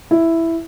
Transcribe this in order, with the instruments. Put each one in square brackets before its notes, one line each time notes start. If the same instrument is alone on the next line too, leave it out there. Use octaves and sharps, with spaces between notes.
[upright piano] E4